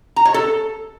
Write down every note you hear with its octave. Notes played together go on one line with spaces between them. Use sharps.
A#5
C#5
A4